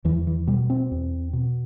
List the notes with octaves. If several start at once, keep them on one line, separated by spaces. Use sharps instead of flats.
E2 E3
E3
B2 G3
C4
E2
B2